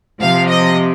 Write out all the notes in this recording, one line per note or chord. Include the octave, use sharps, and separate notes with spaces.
C3 F3 F5
D#5